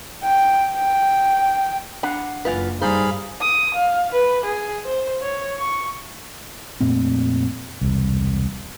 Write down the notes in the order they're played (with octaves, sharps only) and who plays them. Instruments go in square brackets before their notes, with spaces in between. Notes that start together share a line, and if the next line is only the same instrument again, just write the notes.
[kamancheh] G5
G5
[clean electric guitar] D4 F5 F#5 [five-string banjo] B5
[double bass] F#1 [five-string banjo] E3 F4 B4
[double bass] G2 G3 [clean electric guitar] D#4 D5 [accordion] G#4 F5 B5 [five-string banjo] C5
[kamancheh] D#6
F5
B4
G#4
C5
C#5
C#6
[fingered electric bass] F2 A#2 A3 C4
E1 C2